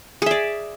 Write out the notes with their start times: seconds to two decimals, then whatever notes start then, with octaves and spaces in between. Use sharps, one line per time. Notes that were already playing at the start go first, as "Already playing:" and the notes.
0.22 G#4
0.26 E5
0.31 D5